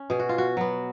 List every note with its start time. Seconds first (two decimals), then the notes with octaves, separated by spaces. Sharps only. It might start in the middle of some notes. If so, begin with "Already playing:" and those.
Already playing: C#4
0.10 B2 G#4
0.20 F#4
0.29 F4
0.38 F#4
0.57 F#3 B3